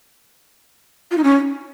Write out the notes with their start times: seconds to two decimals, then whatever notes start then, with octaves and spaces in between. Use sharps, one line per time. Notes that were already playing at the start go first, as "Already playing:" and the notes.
1.11 F4
1.17 D#4
1.24 C#4